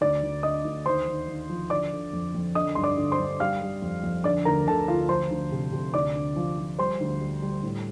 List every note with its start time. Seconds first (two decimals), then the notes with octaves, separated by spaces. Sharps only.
0.01 D2 D5 D6
0.23 D2
0.43 D3 D#5 D#6
0.65 D2
0.86 D#2 C5 C6
1.08 D#2
1.28 D#2
1.50 F3
1.70 D3 D5 D6
1.92 D3
2.13 F2
2.35 F2
2.55 D3 D#5 D#6
2.75 G2 C6
2.83 D5 D6
2.97 D3
3.12 C5 C6
3.19 G2
3.40 G3 F5 F6
3.61 G3
3.82 F2
4.04 F2
4.24 D3 D5 D6
4.45 D2 A#4 A#5
4.67 D2 A4 A5
4.88 D2 F4 F5
5.09 F3 C5 C6
5.30 D2
5.52 C3
5.72 C3
5.94 D2 D5 D6
6.15 D3
6.36 F3
6.58 F3
6.78 G3 C5 C6
7.01 D2
7.21 G3
7.42 G3
7.63 A2